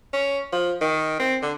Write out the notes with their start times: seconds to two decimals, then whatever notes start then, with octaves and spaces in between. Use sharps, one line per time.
0.13 C#4
0.52 F3
0.81 D#3
1.19 C4
1.43 D3